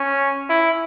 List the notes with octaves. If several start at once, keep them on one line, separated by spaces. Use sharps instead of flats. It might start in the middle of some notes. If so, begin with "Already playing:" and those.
Already playing: C#4
E4